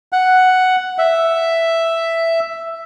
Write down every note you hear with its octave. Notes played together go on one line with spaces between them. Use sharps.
F#5
E5